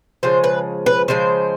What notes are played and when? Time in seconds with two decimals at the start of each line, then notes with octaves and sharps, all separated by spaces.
0.23 C#3 F3 G#3 C5
0.44 B4
0.86 B4
1.08 C#3 F3 G#3 C5